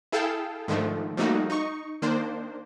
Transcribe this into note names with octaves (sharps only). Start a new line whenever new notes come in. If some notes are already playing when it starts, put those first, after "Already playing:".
E4 G#4 A4 F5 G5 A5
G#2 D3 D#3 F3 A3
F3 G3 A3 A#3 D#4 F#4
D#4 C#6
D#3 A#3 D4 C5